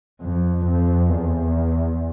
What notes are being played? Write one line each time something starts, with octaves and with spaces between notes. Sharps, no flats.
F2
F2
E2